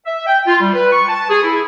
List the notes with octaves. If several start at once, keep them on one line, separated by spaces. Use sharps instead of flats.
E5
G5
F4
G3
B4
C#6
A5
G#4
E4